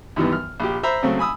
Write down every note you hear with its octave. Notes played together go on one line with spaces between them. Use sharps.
F#2 D#3 E3 G3 B3
F6
A#1 G4
C5 E5 A#5 B5
C#3 F#3 A3 C4
G#5 B5 D#6 E6